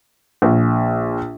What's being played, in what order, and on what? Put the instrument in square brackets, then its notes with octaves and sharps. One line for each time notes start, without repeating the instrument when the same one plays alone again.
[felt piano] A#1